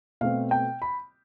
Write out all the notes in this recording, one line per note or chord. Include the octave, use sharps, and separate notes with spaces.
B2 A3 C4 F5
G5
B5